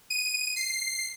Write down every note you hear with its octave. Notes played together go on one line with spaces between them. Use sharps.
D#7
C7